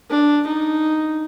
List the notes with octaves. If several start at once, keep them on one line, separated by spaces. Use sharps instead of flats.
D4
D#4